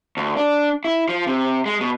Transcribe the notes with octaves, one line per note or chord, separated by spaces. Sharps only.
D2
D4
E4
F3
C3
G#3
B2